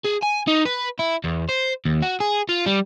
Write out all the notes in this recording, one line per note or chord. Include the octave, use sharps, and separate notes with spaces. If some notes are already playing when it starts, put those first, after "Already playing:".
G#4
G#5
D#4
B4
E4
E2
C5
D#2
F#4
G#4
F4
G3